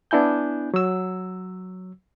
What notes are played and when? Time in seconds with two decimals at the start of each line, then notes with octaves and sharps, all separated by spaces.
0.11 B3 D4 E4 G#5 G6
0.74 F#3 E6